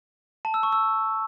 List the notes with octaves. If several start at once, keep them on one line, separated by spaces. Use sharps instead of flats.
A5
E6
C#6
E6